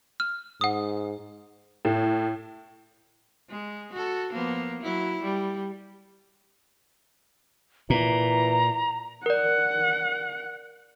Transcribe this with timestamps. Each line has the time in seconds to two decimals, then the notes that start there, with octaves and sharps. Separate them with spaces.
0.20 F6
0.61 G#2 F#5 D#6
1.85 A2
3.49 G#3
3.93 F#4 A4
4.33 F3 A#3 B3
4.81 F#3 E4
5.22 G3
7.90 A#2 E3 A#5
9.26 A#4 D5 F#5